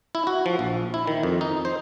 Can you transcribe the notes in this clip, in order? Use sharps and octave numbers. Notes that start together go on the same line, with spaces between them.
E4
F#4
F3
A#1
E4
D#3
F2
D#4
C5